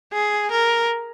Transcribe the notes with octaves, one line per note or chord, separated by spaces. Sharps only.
G#4
A#4